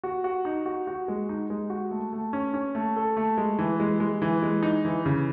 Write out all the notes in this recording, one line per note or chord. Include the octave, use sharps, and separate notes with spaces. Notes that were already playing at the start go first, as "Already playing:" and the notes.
F#4
F#4
D#4
F#4
F#4
G#3
D#4
G#3
F#4
A3
A3
C#4
C#4
A3
A4
A3
G#3
E3
G#3
G#3
E3
G#3
D#4
E3
C#3